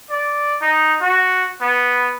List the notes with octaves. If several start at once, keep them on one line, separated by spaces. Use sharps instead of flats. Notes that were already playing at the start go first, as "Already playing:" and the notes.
D5
D#4
F#4
B3